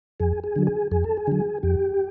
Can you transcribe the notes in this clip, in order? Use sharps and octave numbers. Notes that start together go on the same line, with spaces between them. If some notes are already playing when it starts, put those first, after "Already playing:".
F2 G#4
G#4
D3 F#3
G#4
F2 G#4
A4
G#4
D3 F#3
F2 G4